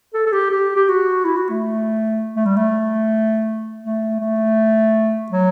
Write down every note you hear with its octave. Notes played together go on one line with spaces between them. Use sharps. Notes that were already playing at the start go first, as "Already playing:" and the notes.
A4
A4
G4
G4
G4
F#4
E4
F#4
A3
A3
G3
A3
A3
A3
F#3